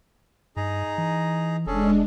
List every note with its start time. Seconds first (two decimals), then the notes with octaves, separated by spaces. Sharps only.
0.57 G2 D#4 G#4 A#5
0.98 E3
1.67 F1 G#3 C#4 D4 G#4 A4